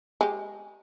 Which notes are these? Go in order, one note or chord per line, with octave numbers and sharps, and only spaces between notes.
G#3 G4